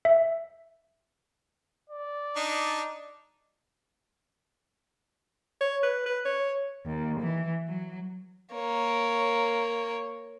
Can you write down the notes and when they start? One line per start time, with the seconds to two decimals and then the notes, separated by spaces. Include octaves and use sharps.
0.05 E5
1.90 D5
2.36 D4 D#4
5.61 C#5
5.83 B4
6.06 B4
6.25 C#5
6.86 D#2
7.20 E3
7.68 F#3
8.54 A#3 C#5